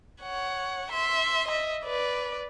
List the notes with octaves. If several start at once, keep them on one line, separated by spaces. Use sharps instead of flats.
C#5 F#5
E5 C6
D#5 E5
B4 D5